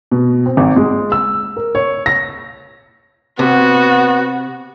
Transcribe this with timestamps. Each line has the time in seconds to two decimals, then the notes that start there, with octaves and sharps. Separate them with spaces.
0.11 B2
0.46 C4
0.57 G#1
0.76 G#3
1.12 E6
1.57 A#4
1.75 C#5
2.06 A#6
3.39 C3 B3 F#4